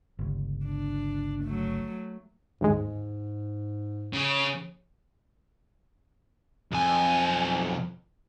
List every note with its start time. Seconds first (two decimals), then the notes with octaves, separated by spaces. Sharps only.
0.19 G1 C#2
0.65 D4
1.44 F#3 A3
2.61 G1 D#2 G#2 G#3
4.13 C#3
6.72 B1 F2 G#5